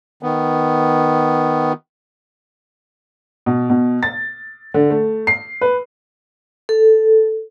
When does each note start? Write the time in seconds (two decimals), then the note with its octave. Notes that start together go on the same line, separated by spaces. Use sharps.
0.23 D#3 B3
3.46 B2
3.70 B2
4.03 A6
4.74 D3
4.90 A3
5.27 C7
5.61 B4
6.69 A4